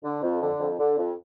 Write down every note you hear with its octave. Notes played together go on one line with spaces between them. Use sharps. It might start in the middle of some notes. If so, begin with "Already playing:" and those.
D3
F2
D3
F2
D3
F2